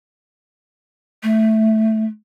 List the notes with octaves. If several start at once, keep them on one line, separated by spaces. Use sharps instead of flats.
A3